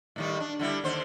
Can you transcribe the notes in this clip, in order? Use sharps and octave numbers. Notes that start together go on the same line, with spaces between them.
A2 D#3 G3
D4
D3 G3 E4
D#2 D3 C5